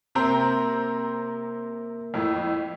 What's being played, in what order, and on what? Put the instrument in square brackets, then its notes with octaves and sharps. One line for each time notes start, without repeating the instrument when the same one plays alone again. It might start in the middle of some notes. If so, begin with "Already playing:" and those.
[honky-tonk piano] C3 C4 A#5 [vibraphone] A#3 A#4 E5
[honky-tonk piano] F2 A2